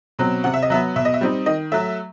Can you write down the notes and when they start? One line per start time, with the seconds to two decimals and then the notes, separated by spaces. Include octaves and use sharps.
0.19 B2 F#3 C4
0.44 C3 F#5
0.54 E5
0.63 D#5
0.70 F#3 B3 E5
0.96 B2 E5
1.05 D#5
1.14 E5
1.21 G3 C4 D#4
1.46 D#3 D#5
1.72 F#3 A3 E5